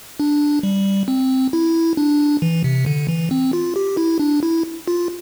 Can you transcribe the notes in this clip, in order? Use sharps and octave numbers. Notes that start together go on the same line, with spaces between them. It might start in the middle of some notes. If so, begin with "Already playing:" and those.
D4
G3
C4
E4
D4
E3
C3
D3
E3
C4
F4
G4
E4
D4
E4
F4